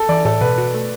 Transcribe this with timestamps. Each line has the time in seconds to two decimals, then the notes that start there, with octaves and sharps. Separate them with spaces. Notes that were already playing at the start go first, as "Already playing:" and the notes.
Already playing: A4
0.09 E3 D5
0.25 A2 A4
0.41 B2 B4
0.58 F#4
0.74 A3